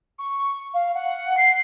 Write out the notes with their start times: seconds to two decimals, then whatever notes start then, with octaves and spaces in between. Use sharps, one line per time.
0.19 C#6
0.74 F5
0.95 F#5
1.37 C7